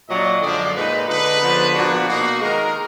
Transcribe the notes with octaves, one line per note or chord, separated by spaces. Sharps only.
A#2 F#3 A#3 D4 D#5
F#2 D3 F3 G#3 D5
A#2 G#3 D#4 B4
D3 G#3 D#4 B4
D3 F3 B3 D4
A#2 F3 B3 D4 F#4
B2 A#3 D#4 F#4
D#3 G#3 D#4 A#4